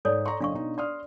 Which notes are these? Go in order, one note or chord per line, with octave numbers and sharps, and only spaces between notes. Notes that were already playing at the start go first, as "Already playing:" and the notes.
G#2 A4 C#5 D5
D5 A#5 C6 C#6
F#1 D4 D#5 F5 C#6
B2 D#4
D5 C6 D#6 F6